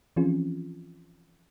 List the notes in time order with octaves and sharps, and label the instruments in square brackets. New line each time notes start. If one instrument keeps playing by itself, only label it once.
[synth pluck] E3 F3 C4 C#4 F4 G#4